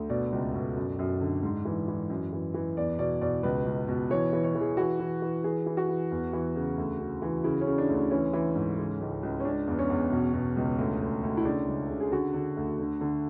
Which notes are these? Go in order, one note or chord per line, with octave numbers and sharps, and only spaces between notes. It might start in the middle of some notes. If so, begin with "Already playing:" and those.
Already playing: D2
B2 D5
C#2
B2
F#2
F#2
D3
G#2
E3
E3
F#2
E3
E3
E2 D5
B2 D5
B2 D5
C#2 B4
C#2
B2
E3 C#5
E3
C#5
E3
G#4
E3 F#4
E3
E3
E3 G#4
E3
F#4
E3
E2
E3
C#3
D2
C#3
E3
C#3 E4
C#4
C#3
D4
D2
D4
E3 C#4
E3
G#2
C#3
C#2
C#2
C#4
C#3 D4
E2
C#4
E2
B2
B2
C#2
D2
D2
D2
E4
C#3 D4
C#2
C#3
G#4
D3 F#4
D3
D2
D3
D3